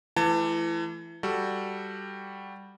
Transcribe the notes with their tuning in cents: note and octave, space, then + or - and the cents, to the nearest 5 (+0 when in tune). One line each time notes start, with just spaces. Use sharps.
E3 +25 A3 -15 A5 +35
G3 +0 F#4 +0 A4 +0